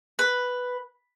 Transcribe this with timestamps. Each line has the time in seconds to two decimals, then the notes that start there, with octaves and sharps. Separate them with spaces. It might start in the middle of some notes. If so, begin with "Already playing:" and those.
0.19 B4